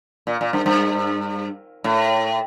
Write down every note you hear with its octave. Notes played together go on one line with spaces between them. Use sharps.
A#2
A#2
G2
G2
A2